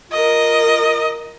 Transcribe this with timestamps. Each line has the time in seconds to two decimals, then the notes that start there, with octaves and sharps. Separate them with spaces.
0.13 F4 A#4 D#5